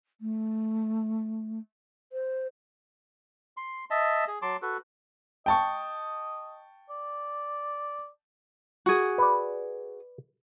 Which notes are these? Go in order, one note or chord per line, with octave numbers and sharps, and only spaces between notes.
A3
C5
C6
D#5 E5 A5
G#4
F#3 A5 C6 D6
F#4 A4 B4
D#5 G5 A5 C#6
D5
F#4 G#4
B4 D5